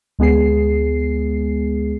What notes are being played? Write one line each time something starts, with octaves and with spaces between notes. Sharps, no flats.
D2 G#3 B3 G#4 C7